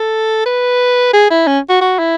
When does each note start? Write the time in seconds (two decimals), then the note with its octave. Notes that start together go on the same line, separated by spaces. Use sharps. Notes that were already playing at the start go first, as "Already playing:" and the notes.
Already playing: A4
0.46 B4
1.13 G#4
1.31 E4
1.47 C#4
1.70 F#4
1.81 F#4
1.99 E4